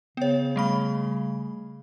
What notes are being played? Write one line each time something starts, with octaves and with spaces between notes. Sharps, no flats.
C#3 B3 C#5
G3 A3 B5